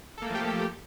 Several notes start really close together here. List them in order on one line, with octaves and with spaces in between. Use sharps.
A4 A#3 A3 F3 G4